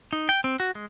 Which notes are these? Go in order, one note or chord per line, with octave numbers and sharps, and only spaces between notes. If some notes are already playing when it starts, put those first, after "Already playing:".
D#4
G5
C4
F#4
G#3